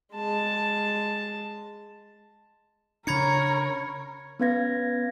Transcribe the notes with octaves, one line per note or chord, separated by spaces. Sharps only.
G#3 A5
C#3 D4 A#4 C#5 B5 G#6 C#7
B3 C#4 B4 F5 G#6 A#6